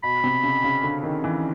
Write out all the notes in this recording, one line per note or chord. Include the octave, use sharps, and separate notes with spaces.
B2 B5
C3
C#3
C#3
D3
D#3
E3